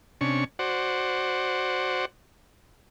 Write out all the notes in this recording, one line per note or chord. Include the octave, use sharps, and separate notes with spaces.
C3 C#4 D4 C#6
F#4 C5 D5 F#5